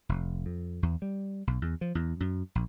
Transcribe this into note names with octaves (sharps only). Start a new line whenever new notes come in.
F1
F2
E2
G3
B1
E2
F3
E2
F#2
A#1